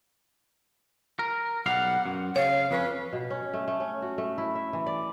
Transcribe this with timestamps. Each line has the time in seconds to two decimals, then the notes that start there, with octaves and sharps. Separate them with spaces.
1.19 A#4
1.66 B1 G3 F5 F#5
2.06 F#2
2.36 C#3 C#5 F5
2.71 F2 C#4 B4
3.13 B2
3.30 C#4
3.53 A3
3.68 A3
3.80 C#4
4.02 F#4
4.18 A3
4.38 E4
4.55 E5
4.73 E3
4.86 D5